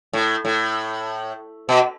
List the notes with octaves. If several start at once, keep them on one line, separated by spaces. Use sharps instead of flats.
A2
A2
B2